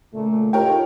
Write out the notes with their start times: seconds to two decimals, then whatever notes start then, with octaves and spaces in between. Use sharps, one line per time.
0.14 A#2 C#3 A3
0.53 D#4 F4 G4 A#4 C#5 G5